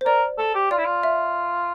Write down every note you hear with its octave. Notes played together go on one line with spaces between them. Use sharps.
C5
A#4 D5
A4
G4
F4 D5
E4
F4
E5